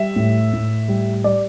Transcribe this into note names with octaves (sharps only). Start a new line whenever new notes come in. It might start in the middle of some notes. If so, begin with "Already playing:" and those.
Already playing: G3 E5
A2
A2
G3
G3 D5